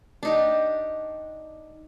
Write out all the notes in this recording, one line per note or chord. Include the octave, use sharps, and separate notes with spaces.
D4 D#4 G4